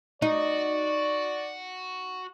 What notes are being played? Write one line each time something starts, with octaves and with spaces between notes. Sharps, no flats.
D#4 F#4 D5